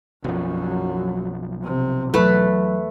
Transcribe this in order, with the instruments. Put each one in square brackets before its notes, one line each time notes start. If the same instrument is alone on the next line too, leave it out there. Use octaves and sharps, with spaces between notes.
[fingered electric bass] B1 F3 [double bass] F#2 F#3
[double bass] C3
[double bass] E2 [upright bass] F#3 [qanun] A3 B4